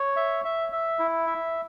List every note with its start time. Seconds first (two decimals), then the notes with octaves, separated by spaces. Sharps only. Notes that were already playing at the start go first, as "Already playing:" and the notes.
Already playing: C#5
0.16 E5
0.44 E5
0.72 E5
0.99 E4
1.27 E5